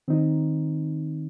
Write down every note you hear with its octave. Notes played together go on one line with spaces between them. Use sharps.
D#3 C4 D#4